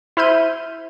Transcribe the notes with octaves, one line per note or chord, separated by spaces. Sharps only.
E4 C5 E5 F6 G6 D#7